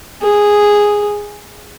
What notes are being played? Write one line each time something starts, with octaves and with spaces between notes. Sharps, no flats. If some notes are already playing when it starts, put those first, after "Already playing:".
G#4